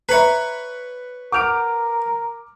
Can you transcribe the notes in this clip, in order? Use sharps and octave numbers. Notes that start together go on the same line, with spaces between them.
B4 C#5 E5 A#5
A#4 F#5 D6 F6 G6 D7 F7